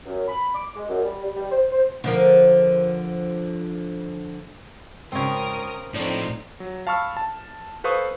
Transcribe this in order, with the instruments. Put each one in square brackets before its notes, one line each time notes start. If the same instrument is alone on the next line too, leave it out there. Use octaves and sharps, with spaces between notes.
[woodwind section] F#2
B5
D6
G#3
F#2
G3
G3
G3
C5
C5
[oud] D3 F3 A#4
[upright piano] G#1 C#6 [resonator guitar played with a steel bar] C#3 C4 [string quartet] A#4 D#6
[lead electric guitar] A2 [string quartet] F3 C4 D#4 [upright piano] A3 D4
[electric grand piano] F#3
F5 A5 B5 C#6 E6 F6
A5
A4 B4 C5 F5 C#6 D#6